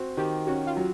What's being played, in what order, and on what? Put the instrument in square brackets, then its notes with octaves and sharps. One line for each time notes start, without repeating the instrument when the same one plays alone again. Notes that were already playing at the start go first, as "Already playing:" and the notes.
Already playing: [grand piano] C4 [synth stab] F#4
[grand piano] D#3 [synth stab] G4
[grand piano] C#4 [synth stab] F#4
[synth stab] F4
[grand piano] F#3